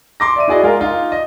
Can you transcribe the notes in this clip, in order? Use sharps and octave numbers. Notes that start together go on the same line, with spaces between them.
C6 D6 A#6
D5 E5 D#7
E4 F#4 G#4 D5 D#5
G#3 F4 G#4 A#4
D#4 F4
D#5